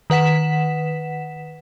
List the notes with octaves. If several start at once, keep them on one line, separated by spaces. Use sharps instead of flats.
D#3 B4 F#5 B6 E7